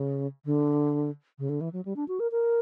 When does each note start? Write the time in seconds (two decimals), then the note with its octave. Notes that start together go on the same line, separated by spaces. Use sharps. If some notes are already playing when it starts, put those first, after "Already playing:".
Already playing: C#3
0.45 D3
1.39 C#3
1.49 D3
1.61 E3
1.73 F#3
1.85 G3
1.96 D4
2.08 F#4
2.20 A#4
2.31 A#4